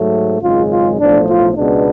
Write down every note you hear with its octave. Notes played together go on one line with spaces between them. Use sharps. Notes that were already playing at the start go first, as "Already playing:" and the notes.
Already playing: G#2 F#3 A3
G#1 F#2 C#3 G#3 F4
F4
B1 A2 F3 A3 D4
F4
C#2 B2 G#3 B3 D4